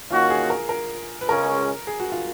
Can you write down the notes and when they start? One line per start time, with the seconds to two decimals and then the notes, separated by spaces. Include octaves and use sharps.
0.10 D#3 A#3 C#4 F4 F#4
0.30 G#4
0.50 A#4
0.69 A#4
1.21 B4
1.28 C#2 C#3 G#3 C#4 A#4
1.87 G#4
2.00 F#4
2.12 F4